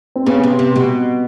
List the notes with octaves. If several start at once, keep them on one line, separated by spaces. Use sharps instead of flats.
C4
C#3 B3
C3
C3
B2